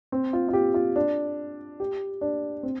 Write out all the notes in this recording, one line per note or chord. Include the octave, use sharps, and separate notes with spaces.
C4
F4
F4
G4
F4
D4
G4
D4
C4